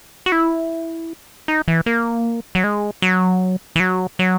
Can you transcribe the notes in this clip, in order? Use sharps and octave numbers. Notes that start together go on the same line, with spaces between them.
F#4
E4
D#4
E3
A#3
F#3
G#3
F#3
E3
F#3
F#3